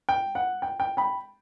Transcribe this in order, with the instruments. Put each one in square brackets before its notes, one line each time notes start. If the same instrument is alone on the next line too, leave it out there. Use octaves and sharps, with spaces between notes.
[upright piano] G5
F#5
G5
G5
G5 B5